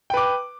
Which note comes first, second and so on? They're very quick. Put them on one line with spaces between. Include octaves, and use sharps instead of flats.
G5 B4 D6